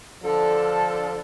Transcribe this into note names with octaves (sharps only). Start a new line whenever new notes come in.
D3 F3 D4 A4